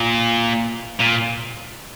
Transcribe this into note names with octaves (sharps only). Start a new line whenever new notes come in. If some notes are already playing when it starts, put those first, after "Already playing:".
Already playing: A#2
A#2